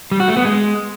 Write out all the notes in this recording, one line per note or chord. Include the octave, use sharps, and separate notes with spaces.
G3
F#4
A3
B3
G#3